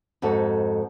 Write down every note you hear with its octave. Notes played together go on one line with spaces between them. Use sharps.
F2 G#2 F#4 A4